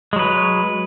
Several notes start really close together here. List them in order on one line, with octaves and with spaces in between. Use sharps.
G#3 F#3 B4